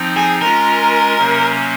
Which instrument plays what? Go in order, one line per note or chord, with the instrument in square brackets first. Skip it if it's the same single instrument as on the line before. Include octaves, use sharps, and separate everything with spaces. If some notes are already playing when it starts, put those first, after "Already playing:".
Already playing: [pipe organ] F3 C4 D#4
[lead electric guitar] G#4
[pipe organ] G#3 C#4 F4 [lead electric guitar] A#4
[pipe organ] C3 F#3 A#3 C#4